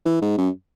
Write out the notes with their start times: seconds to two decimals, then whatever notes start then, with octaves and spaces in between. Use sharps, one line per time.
0.06 E3
0.22 G#2
0.38 F#2